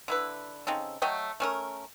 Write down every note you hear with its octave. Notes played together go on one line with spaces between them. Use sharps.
D3 E4 B4
C#3 C4 D#4 A4
F#3 A3 D#5 G5
A3 C#4 A#4